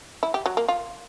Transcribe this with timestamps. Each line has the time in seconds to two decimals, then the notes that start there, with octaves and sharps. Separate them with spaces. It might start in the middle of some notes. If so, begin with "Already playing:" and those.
0.23 E4
0.34 G4
0.46 F#3
0.57 A#3
0.68 F4